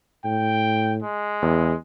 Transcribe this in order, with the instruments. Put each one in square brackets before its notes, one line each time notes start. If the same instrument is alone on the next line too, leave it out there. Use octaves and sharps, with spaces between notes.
[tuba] A2 [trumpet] G5
[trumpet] G#3
[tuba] E2